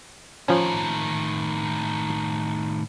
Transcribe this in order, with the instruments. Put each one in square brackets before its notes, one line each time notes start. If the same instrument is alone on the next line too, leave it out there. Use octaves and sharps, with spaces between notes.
[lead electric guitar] A2 D#3 [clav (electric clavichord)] F3 C#4